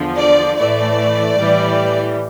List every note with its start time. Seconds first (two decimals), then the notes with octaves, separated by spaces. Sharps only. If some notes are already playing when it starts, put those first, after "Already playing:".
Already playing: E2 D3 F3
0.18 D5
0.57 A2 E3 A3 D5
1.36 A2 E3 G3